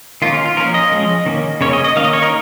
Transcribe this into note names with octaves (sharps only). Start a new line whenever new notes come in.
D#3 A#3 C#4 F4
F4
F4
F3 A#3 C#4 A#4
D#5
F3 G#3 C#4
D#3 A#3 C#4
C#3 A#3 C#4 C#5
D#5
D#5
D#3 A#3 C#4 F5
D#5
C#5
A#4